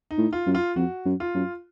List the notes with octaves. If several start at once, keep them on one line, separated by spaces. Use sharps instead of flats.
D#4
A2
F4
F#2
F4
F2 F#4
F#2
F4
F#2